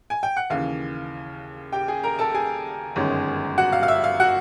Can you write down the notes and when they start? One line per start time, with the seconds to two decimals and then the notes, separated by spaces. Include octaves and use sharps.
0.10 G#5
0.23 G5
0.37 F#5
0.50 D#2 C#3 E3 F5
1.72 G4 G5
1.88 G#4 G#5
2.03 A#4 A#5
2.19 A4 A5
2.34 G#4 G#5
2.96 G1 F#2 D#3 G#3 C#4
3.58 F#4 F#5
3.72 F5
3.83 F5
3.88 E5
4.04 F5
4.20 F#4 F#5